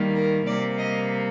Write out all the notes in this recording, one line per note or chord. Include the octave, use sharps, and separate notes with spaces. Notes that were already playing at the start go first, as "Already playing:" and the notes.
Already playing: D#3 G3 A#3
A#4
C3 G3 A#3 D5
D#5